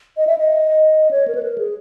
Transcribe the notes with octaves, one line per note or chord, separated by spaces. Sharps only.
D#5
E5
D#5
C#5
A#4
B4
A#4
G#4